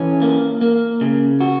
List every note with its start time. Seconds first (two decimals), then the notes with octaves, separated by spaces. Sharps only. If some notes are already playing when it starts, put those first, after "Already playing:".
Already playing: E3 C#4
0.22 A#3
0.61 A#3
1.01 C#3
1.40 F#4